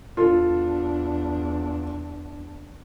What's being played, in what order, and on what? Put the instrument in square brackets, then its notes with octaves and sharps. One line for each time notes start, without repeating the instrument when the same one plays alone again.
[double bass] E2 D4 [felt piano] F4 A4